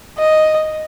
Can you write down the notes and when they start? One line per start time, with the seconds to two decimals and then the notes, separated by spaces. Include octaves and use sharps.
0.18 D#5